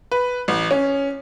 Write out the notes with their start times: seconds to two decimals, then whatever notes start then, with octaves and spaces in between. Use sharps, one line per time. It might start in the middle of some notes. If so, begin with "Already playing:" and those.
0.12 B4
0.48 A1
0.71 C#4